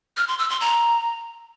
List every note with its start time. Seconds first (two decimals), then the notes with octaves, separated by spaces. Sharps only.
0.17 F6
0.28 C6
0.39 E6
0.50 C6
0.61 A#5